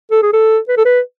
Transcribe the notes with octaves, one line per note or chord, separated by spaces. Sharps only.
A4
G#4
A4
B4
A4
B4